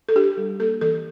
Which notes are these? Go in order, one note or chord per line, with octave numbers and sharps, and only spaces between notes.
A4
D4 G4
G3
A#3 A4
E3 A4